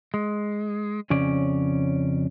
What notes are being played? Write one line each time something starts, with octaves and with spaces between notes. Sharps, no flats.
G#3
F2 C#3 C#4 D5